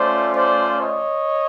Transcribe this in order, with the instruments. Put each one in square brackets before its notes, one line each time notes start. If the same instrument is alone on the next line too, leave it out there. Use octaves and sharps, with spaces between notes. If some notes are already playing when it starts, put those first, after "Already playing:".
Already playing: [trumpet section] A3 C#4 F4 C5 D5
C5 D5
C#5 D#5